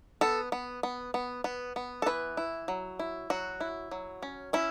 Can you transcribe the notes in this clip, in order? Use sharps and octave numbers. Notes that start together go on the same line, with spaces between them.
B3 A4
B3
B3
B3
B3
B3
A4
E3 B4
E4
F#3
E4
F#3 F#4
E4
F#3
C#4
C#4 E4